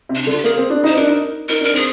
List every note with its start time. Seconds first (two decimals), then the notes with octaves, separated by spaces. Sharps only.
0.09 C3
0.15 D4
0.23 D#4
0.27 D3
0.30 F4
0.37 G4
0.44 A#3 G#4
0.58 C4
0.70 D4
0.84 D#4 C5
0.97 D4 A#4
1.09 D#4
1.49 D#4 A#4
1.61 D4 A#4
1.74 C4 G#4